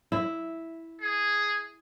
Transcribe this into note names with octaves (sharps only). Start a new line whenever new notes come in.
E4
G#4